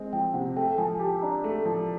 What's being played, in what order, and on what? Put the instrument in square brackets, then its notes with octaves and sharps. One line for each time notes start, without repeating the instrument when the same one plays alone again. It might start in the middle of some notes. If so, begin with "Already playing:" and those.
Already playing: [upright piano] G#3 C4
[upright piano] F3 [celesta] G5
[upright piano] C3 [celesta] F#5
[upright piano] A3 [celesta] G5
[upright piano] F3 [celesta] G#5
[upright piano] G4 [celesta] A5
[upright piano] D4 [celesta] A#5
[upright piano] A3
F3